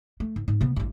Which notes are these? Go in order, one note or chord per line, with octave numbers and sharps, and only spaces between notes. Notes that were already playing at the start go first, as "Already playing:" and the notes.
A3
G#2
G#2
C3 B3
A1 G2